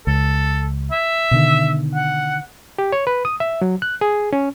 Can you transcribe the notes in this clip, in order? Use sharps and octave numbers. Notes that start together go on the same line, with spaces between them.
C#2 A4
E5
B2 D3 D#3
F#5
G4
C#5
B4
D#6
E5
F#3
F#6
G#4
C#4